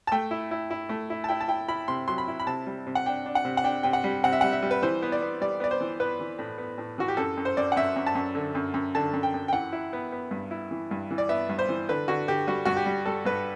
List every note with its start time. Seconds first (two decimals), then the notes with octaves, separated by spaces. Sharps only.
0.07 A5
0.12 A3 G5
0.31 E4
0.51 E4
0.70 E4
0.89 A3
1.10 E4
1.24 A5
1.28 E4 G5
1.41 A5
1.48 E4 G5
1.68 E4 B5
1.88 C3 C6
2.08 F#3 C6
2.18 B5
2.28 E4
2.40 B5
2.47 C3 A5
2.66 G3
2.87 C3
2.95 F#5
3.06 D4 G5
3.26 D4
3.35 F#5
3.45 C3
3.57 F#5
3.64 D4 G5
3.83 C3 G5
3.93 F#5
4.04 G3
4.24 C3 F#5
4.32 E5
4.41 G3 F#5
4.53 E5
4.62 G3
4.71 B4
4.82 E3 C5
5.02 B3
5.12 D5
5.22 B3
5.41 G3 D5
5.60 B3 D5
5.71 C5
5.81 E3
6.00 B3 B4
6.20 E3
6.39 A2
6.58 B3
6.78 A2
6.98 E3 F#4
7.08 G4
7.17 F#2 A4
7.37 F#2
7.45 C5
7.57 F#2 D5
7.72 F#5
7.76 F#2 E5
7.96 F#2
8.07 A5
8.15 F#2
8.35 D3
8.55 F#2
8.74 F#2
8.95 D3 A5
9.13 F#2
9.23 G5
9.34 F#2
9.48 G5
9.53 E3 F#5
9.72 E4
9.93 B3
10.12 B3
10.31 G2
10.51 E4
10.71 E3
10.91 G2
11.11 E3
11.18 D5
11.29 B3 E5
11.49 G2
11.59 C5
11.69 E3
11.88 D3 B4
12.08 D3 F#4
12.28 D3 G4
12.47 G3 F#4
12.65 G2 F#4
12.77 G4
12.86 G3
13.06 G3 A4
13.25 G2 B4